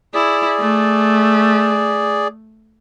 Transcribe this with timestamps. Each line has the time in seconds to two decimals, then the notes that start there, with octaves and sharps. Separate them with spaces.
0.14 E4 G#4 D5
0.59 A3